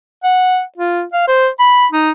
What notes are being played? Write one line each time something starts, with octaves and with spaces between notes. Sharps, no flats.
F#5
F4
F5
C5
B5
D#4